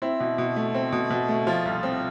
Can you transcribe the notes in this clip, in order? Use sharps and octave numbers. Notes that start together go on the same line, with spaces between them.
C4 E4
B2
B2
A3
C4
B2
B2
A3
F3 F4
C2
C4